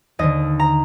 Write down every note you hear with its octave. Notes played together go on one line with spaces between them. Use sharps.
D#2 D3 D#5
A#5